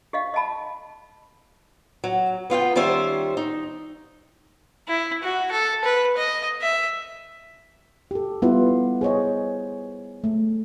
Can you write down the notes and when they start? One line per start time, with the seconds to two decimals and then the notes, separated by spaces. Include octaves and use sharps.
0.13 G4 D#5 F5
0.34 D#5 F#5 A5 B5
2.04 F#3
2.50 B3 F4 F5 G5
2.75 D#3 G3 C#4 F4 C5 E5
3.37 D#4
4.88 E4
5.23 F#4
5.51 A4
5.84 B4
6.17 D#5
6.62 E5
8.11 G4 A4
8.42 G3 B3 E4 F4 B4
9.01 G#4 C5 C#5 D#5
10.24 A3